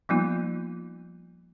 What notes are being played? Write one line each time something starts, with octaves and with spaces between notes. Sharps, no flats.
F3 G3 A#3 B3 D#4 F4